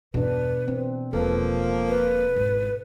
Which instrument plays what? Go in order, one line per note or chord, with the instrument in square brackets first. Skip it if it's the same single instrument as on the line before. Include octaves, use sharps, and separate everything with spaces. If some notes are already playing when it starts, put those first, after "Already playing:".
[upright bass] E2 G2 [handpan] B2 D4 [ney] B4
[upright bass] E3 [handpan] C4
[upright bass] E1 [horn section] F3 A#3 [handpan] A4 [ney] B4
[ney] B4
[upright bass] G#1 E4